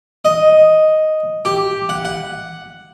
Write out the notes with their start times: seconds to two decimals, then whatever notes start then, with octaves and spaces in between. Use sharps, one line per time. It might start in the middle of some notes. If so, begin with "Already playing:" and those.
0.25 D#5
1.45 G4
1.89 F#5
2.05 F#5